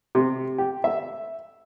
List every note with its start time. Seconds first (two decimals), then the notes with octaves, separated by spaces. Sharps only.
0.15 C3
0.58 G4
0.84 E5